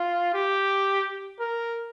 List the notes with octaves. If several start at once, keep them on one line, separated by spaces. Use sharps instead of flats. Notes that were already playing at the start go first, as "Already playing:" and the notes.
Already playing: F4
G4
A#4